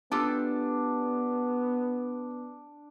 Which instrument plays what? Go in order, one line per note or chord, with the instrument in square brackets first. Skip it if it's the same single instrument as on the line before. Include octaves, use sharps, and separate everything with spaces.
[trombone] B3 [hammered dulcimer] D4 [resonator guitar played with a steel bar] F4 G4 A4